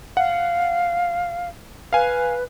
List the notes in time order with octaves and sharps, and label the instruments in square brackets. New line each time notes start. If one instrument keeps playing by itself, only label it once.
[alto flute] F5 [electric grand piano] F#5
[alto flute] B4 [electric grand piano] F5 G#5